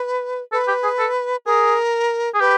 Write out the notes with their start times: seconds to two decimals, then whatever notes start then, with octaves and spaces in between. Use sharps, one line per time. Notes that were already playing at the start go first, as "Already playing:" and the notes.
Already playing: B4
0.52 A4 B4
0.68 G4
0.83 G#4
0.99 A4
1.46 G#4 A#4
2.34 G#4
2.40 G4 B4